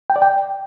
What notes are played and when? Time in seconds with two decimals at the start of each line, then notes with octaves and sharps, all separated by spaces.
0.10 G5
0.16 D5
0.22 G5